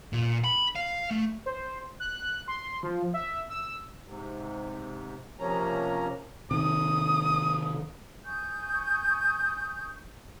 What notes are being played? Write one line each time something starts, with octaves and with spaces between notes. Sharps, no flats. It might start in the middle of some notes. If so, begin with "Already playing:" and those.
A#2
B5
F5
A3
C5
F#6
C6
F3
E5
E6
G#2 C3
C3 F3 A#3 C#4 A#5
C3 D#3 D#6
G#5 C#6 D#6 G6